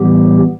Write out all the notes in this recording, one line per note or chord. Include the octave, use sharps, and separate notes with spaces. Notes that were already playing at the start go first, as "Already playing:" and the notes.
Already playing: A2 E3 G3 B3 G4